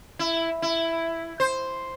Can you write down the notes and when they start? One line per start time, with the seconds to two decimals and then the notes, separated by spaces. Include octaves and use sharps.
0.19 E4
0.62 E4
1.40 C5